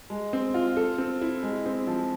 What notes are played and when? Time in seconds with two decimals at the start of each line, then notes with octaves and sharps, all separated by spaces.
0.10 G#3
0.33 C4
0.54 F4
0.77 A4
0.98 C4
1.21 E4
1.43 G#3
1.66 C4
1.87 F3